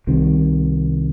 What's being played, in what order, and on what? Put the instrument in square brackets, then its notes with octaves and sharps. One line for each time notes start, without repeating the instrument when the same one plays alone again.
[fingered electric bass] C2 C3 D#3